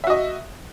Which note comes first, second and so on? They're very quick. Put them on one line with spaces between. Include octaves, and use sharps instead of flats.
E5 F#4 D#5